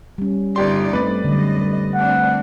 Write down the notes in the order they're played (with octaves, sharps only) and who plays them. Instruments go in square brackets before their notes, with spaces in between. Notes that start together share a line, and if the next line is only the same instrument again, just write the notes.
[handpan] G3 C#4
[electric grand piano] G1 G4 C6 [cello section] D3 D#4 D5
[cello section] G2 [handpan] A3 C4 [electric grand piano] B4 D5
[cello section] F#2 D#5 [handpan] D3 G3
[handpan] G3
[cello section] A3 C4 D4 [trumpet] F#5